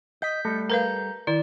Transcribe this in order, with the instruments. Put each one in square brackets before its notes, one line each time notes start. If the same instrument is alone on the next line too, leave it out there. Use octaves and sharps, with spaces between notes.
[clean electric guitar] D#5 [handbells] G6 B6
[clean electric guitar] G3 A4 [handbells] A3
[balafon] A#4 B4 F5 [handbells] A#5 G6
[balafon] D#3 E4 [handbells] D5